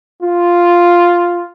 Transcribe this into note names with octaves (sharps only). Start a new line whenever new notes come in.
F4